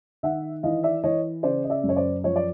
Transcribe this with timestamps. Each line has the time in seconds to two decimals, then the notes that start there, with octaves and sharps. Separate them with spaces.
0.23 D#3 E5 F#5
0.63 E3 D#5 F5
0.83 D5 E5
1.03 E3 C#5 D#5
1.43 C#3 C5 D5
1.64 D#5
1.70 D5 E5
1.83 F#2
1.89 C#5
1.96 C5 D5
2.24 F3 C#5
2.36 D5